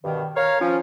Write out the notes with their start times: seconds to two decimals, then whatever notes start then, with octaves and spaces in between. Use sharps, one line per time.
0.03 G2 B2 D#3
0.36 A#4 C#5 F5
0.60 F3 C#4